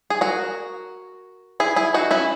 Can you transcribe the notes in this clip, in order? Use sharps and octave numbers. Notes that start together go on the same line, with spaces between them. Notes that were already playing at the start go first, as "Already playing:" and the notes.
G#4
F#4 A#4
E4 G#4
E4 G#4
D#4 F#4
C#4 E4